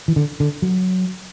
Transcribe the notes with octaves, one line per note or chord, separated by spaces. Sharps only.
E3
D3
D3
F#3